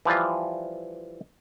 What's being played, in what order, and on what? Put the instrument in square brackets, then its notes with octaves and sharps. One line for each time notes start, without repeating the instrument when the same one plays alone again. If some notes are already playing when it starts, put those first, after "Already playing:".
[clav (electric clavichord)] E3 F3 G3 F4